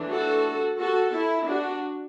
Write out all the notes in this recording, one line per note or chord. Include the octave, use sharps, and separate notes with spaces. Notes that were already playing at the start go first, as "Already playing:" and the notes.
Already playing: E3 A3 D4
F#4 A4
F#4 A4
E4
D4 F#4